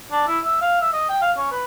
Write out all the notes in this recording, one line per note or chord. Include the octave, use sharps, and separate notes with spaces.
D4
E4
E5
F5
E5
D#5
G5
F5
C#4
B4